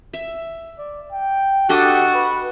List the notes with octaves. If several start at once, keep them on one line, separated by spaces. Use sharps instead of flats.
E5
D5
G5
D4 F#4 G4 A4 D#5
B4